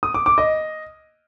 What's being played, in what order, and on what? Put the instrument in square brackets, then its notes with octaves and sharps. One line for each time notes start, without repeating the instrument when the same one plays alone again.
[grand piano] D#6
D6
D6
D#5